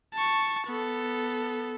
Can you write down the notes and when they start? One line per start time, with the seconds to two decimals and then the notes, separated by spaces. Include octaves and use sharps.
0.14 A5 C#6
0.67 B3 A4